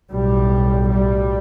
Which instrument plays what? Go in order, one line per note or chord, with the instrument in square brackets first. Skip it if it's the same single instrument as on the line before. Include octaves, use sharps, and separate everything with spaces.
[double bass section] B1 A2 G3
G3